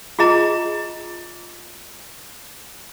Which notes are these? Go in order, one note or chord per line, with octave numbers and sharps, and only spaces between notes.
F4 G#4 D#5 A#5